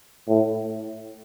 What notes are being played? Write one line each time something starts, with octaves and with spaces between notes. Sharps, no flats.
A2